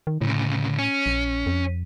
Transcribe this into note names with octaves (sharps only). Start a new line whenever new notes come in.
D#3
D2 A2 C#3
C#4
A#1
F2